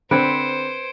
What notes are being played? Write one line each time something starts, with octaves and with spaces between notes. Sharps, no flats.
D3 C4 B4 C5 G#6 C#7 D7